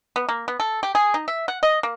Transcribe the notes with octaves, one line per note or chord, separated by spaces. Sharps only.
B3
A#3
B3
A4
G4
G#4
D#4
E5
F#5
D#5
A#3